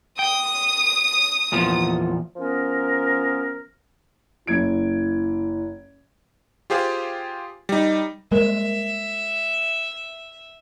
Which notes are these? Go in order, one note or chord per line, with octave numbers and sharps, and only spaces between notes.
G5 D#6
E2 A#2 F3
F3 B3 C#4 A#4
F#1 E4 G#6 D7
F4 G4 G#4 C5 F5
G3 D#4
G3 G#3 A#3 A#4 C5 E5